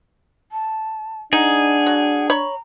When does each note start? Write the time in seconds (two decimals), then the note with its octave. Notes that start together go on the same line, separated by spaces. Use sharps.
0.52 A5
1.33 D4 D#4 G#4 F#5
1.86 F#3
2.30 C#5 A#5 B5 C#6